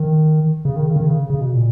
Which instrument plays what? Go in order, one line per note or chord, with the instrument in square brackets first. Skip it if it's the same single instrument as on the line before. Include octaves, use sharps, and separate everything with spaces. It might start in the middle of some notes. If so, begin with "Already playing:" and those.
Already playing: [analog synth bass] D#3
C#3
D#3
C#3
D#3
C#3
C#3
B2
A#2